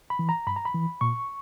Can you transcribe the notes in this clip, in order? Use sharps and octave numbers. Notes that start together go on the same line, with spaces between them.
B5
E3
A#5
G2 B5
A#5
B5
E3
A#2 C#6